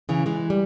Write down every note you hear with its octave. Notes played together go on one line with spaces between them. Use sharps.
C#3 E3
E3 G#3
G3